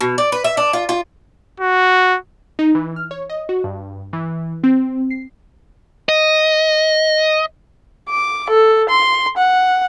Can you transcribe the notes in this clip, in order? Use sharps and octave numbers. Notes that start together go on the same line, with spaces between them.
B2
D5
B4
E5
D4
F4
F4
F#4
D#4
E3
F6
C#5
D#5
F#4
G2
E3
C4
C7
D#5
D6
A4
C6
F#5